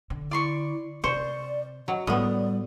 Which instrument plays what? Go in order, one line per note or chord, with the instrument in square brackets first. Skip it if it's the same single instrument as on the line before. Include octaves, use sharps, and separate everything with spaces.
[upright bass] D3
[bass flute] E4 [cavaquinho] D5 C6 C#6
[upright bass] C3 [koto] C5 [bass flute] D5 [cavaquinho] C#6
[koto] F#3 [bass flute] D#5
[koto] A2 B3 [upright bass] G3 [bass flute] D5 [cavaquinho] D#6